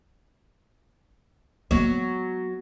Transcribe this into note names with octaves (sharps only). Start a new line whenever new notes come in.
F#3 G#3 B3